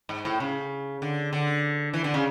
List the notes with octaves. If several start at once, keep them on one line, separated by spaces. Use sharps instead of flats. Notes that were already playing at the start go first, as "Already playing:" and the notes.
G#2
A2
C#3
D3
D3
E3
D3
C#3